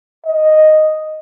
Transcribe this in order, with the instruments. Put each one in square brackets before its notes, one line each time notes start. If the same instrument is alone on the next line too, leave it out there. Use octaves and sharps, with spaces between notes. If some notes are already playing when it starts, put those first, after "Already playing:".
[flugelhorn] D#5